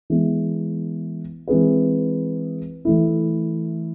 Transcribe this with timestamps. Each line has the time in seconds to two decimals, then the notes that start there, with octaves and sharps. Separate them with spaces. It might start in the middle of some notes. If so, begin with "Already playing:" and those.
0.10 E3 G#3 B3
1.48 E3 G#3 C4 G#4 B4
2.85 E3 A3 E4